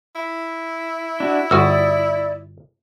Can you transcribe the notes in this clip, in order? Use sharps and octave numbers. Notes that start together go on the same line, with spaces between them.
E4
D4 F#4
G1 F#4 D5 D#6 E6